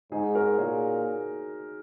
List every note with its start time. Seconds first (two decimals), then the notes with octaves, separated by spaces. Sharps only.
0.12 G#2 D#4 G#4
0.35 F#4 A#4
0.58 A#2 G#4 C#5